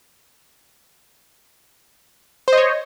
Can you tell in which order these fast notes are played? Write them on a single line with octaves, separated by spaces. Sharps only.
C5 D#5 C#5